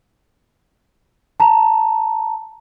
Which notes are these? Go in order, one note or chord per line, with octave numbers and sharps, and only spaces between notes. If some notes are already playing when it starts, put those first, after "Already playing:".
A5 A#5